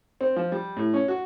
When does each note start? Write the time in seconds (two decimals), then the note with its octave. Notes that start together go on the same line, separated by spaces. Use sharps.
0.21 C4
0.36 F3
0.52 G3
0.77 A2
0.94 C#4
1.08 F#4